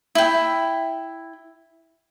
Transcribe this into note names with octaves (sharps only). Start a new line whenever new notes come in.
E4 G5